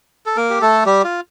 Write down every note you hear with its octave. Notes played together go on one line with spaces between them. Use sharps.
A4
A#3 A#4
G4
A3 A4
G3 G4
F4